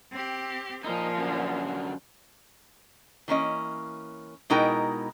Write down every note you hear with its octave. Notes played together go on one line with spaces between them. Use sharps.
C4 G4
A#2 F3 D#4
F#2 D3
E3 A#3 C#4 D#5
B2 G#3 D#4 E4 A#4 G5